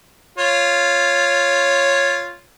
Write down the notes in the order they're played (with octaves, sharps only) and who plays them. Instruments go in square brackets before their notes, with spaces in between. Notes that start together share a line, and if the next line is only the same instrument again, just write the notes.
[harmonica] F4 C#5